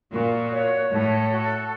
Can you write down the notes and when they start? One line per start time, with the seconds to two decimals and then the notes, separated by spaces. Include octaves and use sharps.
0.12 A#2 F#4
0.52 C#5
0.91 A2 A4
1.30 F#4